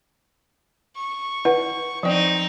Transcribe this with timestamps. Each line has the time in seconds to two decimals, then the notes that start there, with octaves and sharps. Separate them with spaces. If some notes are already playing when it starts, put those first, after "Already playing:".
0.96 C#6
1.45 E4 B4 F#5
2.03 F3 C4 D#4 D5